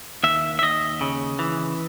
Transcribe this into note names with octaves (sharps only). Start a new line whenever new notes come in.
D#2 E5
E5
D#2 D#5
C#3
E3